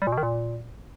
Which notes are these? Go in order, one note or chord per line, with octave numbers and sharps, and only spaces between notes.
G3
A#2
B2
D#3
A#2